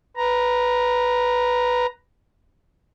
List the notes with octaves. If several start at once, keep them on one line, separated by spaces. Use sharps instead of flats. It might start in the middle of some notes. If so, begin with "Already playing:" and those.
B4 A#5